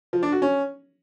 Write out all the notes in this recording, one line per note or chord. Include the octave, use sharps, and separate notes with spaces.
F3
D4
F#4
C#4